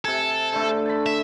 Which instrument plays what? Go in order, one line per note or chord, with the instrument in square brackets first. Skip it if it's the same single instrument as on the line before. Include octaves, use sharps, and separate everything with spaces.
[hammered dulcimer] C3 G#5 [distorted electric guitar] A4
[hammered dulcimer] D3 A3
A5 B5
[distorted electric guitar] E5